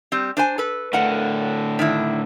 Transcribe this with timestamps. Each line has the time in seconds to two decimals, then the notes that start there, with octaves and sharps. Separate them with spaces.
0.12 G3 C4
0.37 D4 C5 G#5
0.58 A4 B4
0.93 A2 D3 A#4 F#5
1.79 D#3 D4 E4